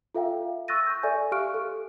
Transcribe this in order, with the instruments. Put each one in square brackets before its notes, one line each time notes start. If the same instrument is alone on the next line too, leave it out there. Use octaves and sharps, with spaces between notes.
[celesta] F4 A4 E5 F5 G5
C#6 E6 F#6 A6 A#6 D#7
C#6 G6
A4 D5 E5 G#5
G4 F5 C#6 F6 F#6 D7
A4